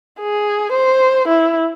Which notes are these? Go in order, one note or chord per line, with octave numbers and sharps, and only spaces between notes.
G#4
C5
E4